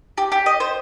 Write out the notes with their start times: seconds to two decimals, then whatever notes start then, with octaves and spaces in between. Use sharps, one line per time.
0.18 G4
0.32 G4
0.46 D#5
0.60 C5